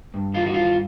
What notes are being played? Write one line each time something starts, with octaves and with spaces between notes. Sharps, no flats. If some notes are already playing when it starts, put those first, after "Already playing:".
G2
E3 F4
F#4
G2 F4